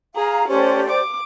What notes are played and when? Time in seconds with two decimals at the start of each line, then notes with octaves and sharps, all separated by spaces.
0.16 G#4 F5 A#5
0.49 A3 C#4 G4 C5 D5
0.90 D6